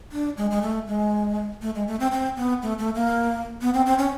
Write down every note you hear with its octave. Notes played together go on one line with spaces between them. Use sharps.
D4
G#3
G#3
A3
G#3
A3
G#3
A3
C4
C4
B3
A3
A3
A#3
B3
C4
C4
C#4